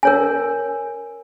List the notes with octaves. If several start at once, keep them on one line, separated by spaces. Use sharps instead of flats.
A#4 C#5 G#5